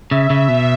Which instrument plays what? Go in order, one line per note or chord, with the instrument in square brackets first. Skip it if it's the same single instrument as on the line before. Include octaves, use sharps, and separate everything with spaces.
[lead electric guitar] C#3 [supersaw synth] E5
[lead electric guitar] C#3
B2